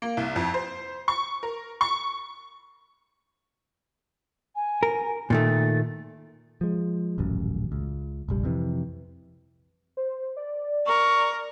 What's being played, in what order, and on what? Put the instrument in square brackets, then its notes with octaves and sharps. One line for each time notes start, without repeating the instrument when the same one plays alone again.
[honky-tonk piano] A#3
C2
F2
C5
C#6
A#4
C#6
[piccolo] G#5
[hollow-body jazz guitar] A#4
[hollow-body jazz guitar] A#2 D#3 A3 [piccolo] A6
[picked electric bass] F3 G#3
D#1 A1 F#2
C#2
F1 A#1 G3
F2 C3 E3
[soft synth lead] C5
D5
[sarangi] A#4 [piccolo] C#6